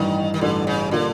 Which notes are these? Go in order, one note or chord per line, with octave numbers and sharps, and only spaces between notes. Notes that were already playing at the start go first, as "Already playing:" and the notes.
Already playing: A1 G2 D#3 E3
D#3
A1 G2 D3 E3
C#3
A#2 D3 G3 A#3